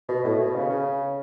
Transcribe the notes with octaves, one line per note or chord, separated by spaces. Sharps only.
B2
A2
B2
C#3
C#3